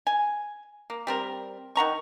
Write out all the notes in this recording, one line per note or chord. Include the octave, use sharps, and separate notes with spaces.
G#5
A#3
G3 C4 A#4
D#3 F#5 A#5 C#6